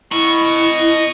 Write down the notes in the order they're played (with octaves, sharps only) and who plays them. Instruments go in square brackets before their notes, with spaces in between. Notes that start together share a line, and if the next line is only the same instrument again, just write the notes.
[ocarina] E4 [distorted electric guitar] D#5 B5 [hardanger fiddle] C#6